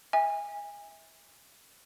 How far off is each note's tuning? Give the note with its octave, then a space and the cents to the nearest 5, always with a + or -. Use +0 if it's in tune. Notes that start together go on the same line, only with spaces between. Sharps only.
E5 -30 G#5 -25